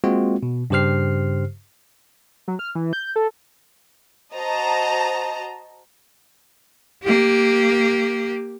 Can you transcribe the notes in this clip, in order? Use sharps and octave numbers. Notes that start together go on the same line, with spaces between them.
G#3 A#3 C4 F4 F#4
B2
G2 C#3 G4 C5 F6 C7
F#3
F6
E3
G6
A4
F#4 C5 D#5 A5 A#5
A#3 G4